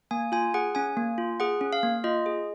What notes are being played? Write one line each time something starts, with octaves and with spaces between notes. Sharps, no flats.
A#3 G#5
F4 G#5
G#4 F#5
C#4 G#5
A#3
F4
G#4 F#5
C#4
F5
A#3
F4 D#5
G#4